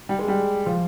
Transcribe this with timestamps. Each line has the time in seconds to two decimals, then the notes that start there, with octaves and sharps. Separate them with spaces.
0.09 G3
0.19 G#3
0.28 G3
0.66 F3